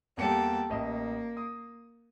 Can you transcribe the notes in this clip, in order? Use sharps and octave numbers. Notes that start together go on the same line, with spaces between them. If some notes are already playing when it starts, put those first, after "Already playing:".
E2 G3 A#3 A4 G5 C#7
A1 A#3 D#5 E5
D#6